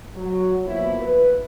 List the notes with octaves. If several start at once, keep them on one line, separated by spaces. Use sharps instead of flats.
F#3
B2 F3 A#3 E4
B4